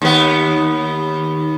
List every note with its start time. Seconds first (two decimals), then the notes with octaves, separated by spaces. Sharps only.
0.02 D#2 B3